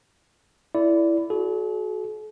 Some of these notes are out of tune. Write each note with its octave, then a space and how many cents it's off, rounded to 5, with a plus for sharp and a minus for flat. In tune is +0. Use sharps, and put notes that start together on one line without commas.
E4 +10 A4 +0 D5 -15
F#4 +0 A4 -45